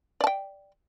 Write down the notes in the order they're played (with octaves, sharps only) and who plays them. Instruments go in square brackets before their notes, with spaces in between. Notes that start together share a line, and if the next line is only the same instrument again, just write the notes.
[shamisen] D5
A5
G5